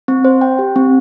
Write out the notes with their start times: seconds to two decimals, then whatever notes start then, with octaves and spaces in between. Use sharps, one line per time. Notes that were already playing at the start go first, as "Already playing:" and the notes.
0.08 C4
0.25 C5
0.41 G5
0.59 G4
0.76 C4